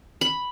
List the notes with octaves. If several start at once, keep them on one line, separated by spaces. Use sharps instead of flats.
B5